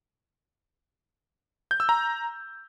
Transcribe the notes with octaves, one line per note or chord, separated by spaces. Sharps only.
G6
E6
A#5